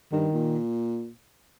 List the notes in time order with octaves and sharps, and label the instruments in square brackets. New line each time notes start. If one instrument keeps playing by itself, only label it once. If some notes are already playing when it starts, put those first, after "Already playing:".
[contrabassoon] G2 [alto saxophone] D#3
[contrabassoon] A#2